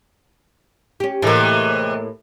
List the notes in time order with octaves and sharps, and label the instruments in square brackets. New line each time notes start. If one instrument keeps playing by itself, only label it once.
[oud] C#4 G4
[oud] A2 A#3 [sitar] C3 E3 G#3